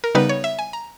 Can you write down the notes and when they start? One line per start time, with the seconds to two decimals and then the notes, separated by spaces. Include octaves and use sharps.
0.04 A#4
0.15 C#3 G3 B3 D#4 B4
0.29 C#5
0.44 E5
0.59 G#5
0.73 A#5